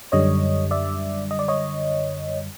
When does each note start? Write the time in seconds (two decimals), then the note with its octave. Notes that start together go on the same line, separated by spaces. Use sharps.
0.12 F#2 D3 G3 C#5 D#5
0.71 D5 E5
1.31 D#5
1.39 D5
1.48 C#5 D#5